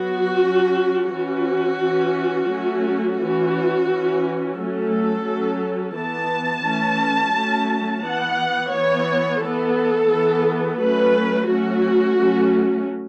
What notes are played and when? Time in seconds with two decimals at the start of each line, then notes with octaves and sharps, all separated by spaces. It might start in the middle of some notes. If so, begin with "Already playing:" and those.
Already playing: F#3 B3 F#4
0.42 F#3 C#4
1.11 E3 C#4 F#4
1.81 E3
1.86 C#4
2.50 F#3 A3 C#4
3.19 E3 C#4 F#4
3.88 E3 C#4
4.57 F#3 A3 C#4 A4
5.26 F#3 C#4
5.95 E3 B3 A5
6.64 E3 A3 C#4
7.33 F#3 A3 C#4
8.03 E3 B3 F#5
8.72 E3 B3 C#5
9.40 E3 B3 A4
10.09 E3 B3
10.78 F#3 A3 C#4 B4
11.47 F#3 A3 C#4 F#4
12.16 F#3 A3 C#4